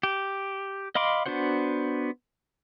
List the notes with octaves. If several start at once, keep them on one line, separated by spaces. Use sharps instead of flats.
G4
D#5 F5 B5 C6 D6
B3 D4 F#4 C5 F#5